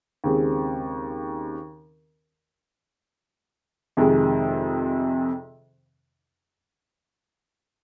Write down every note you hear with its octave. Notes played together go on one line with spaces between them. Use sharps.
D#2 C#3 G#3 C4 G4
F2 C3 D#3 G#3